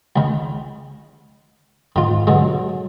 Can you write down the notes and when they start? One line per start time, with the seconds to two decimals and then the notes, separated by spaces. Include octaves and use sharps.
0.16 C#2 D#3
1.96 G#2 D#3 F4
2.27 B2 D3 F#3 G#3